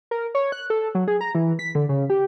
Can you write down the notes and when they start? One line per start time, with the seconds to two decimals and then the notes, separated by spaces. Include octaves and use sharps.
0.11 A#4
0.35 C#5
0.52 F#6
0.70 A4
0.95 F#3
1.08 G#4
1.21 A#5
1.35 E3
1.59 B6
1.75 D3
1.89 C#3
2.10 G4